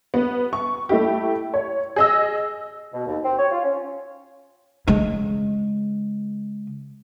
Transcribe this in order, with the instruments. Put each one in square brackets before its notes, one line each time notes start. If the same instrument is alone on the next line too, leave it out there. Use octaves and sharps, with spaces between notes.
[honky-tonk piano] B3
C#6
A3 E4 G4
C#5
G#4 D#5 E6
[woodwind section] B2
D#2
C4
C#5
F4
C#4
[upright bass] C#3 G#3